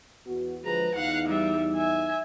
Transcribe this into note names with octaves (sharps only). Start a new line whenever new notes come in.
E2 B3 F#4
D3 F3 G#3 B4 A#5
E2 D#4 F5 F#5
G3 E5
E5 G#5